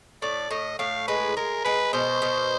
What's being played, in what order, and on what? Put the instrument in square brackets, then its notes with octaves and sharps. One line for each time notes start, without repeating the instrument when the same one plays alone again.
[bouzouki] A2 [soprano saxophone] D5
[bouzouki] A2 [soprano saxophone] D#5
[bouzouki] A2 [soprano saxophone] F5
[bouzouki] G#3 [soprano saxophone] B4
[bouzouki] G#3 [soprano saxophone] A#4
[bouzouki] G#3 [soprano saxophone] B4
[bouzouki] B2 [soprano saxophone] C5
[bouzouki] B2